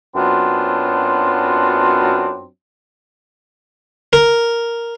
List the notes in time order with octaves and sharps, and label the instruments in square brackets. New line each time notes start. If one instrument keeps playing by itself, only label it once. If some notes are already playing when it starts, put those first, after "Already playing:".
[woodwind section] F#2 F#3 B3 C4 D4 F4
[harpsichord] A#4